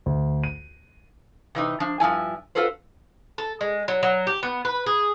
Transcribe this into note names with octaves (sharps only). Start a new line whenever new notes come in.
D2
D#7
C3 E3 D#4
F3 D4
G2 F3 E4 G#5
F4 F#4 A4 B4 C5
A4
G#3
F#3
F#3
G4
B3
B4
G#4